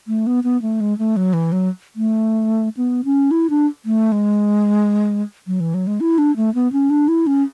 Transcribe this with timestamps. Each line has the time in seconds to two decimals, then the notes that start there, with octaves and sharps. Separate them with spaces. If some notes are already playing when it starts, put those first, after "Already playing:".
0.08 A3
0.27 B3
0.44 B3
0.62 A3
0.80 G#3
0.98 A3
1.17 F#3
1.33 E3
1.52 F#3
1.96 A3
2.77 B3
3.05 C#4
3.31 E4
3.50 D4
3.86 A3
4.12 G#3
5.47 F#3
5.60 E3
5.74 F#3
5.87 G#3
6.00 E4
6.18 D4
6.36 A3
6.55 B3
6.72 C#4
6.90 D4
7.08 E4
7.27 C#4